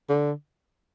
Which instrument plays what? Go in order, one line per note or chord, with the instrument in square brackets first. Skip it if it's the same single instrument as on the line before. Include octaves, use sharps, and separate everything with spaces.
[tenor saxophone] D3